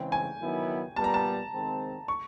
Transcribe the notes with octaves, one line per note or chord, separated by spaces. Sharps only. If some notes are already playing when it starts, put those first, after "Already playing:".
Already playing: C#3 E3 G#3 C4 G5
G#5
D#3 F#3 B3 E4
A#2 G3 B3 A5
A#5
A5
D#3 G#3 C4
C#6